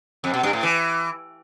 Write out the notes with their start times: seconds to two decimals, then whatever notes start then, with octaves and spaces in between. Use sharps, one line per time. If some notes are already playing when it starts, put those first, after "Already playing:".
0.24 F2
0.34 B2
0.43 G2
0.53 A2
0.63 E3